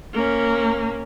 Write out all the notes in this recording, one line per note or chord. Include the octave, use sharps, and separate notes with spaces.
A#3 C#4